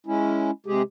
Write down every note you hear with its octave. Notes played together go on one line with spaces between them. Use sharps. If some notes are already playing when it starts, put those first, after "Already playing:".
G#3 C#4 E4
C3 G#3 G4 G#4